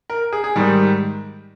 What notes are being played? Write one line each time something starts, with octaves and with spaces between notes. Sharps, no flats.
A#4
G#4
G#4
G#2 D#3 G3